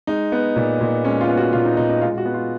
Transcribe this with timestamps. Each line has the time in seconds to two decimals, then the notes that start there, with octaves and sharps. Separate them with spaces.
0.07 G#3 D#4
0.32 B3
0.56 A#2
0.81 A#2
1.04 G#3 C#4
1.21 F4
1.29 B3
1.37 F#4
1.53 A#2 F4
1.65 D#4
1.77 A#2 D#4
1.90 D#4
2.01 G#3 F4
2.18 F#4
2.25 B3
2.34 F4